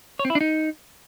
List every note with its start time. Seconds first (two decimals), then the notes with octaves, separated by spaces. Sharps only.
0.19 C#5
0.25 C4
0.30 E4
0.35 D4
0.41 D#4